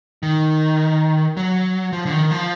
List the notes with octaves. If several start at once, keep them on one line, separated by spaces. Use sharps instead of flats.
D#3
F#3
F3
D3
D#3
F3